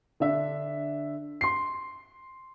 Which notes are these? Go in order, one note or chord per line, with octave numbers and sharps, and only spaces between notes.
D3 D4 E5
C6 C7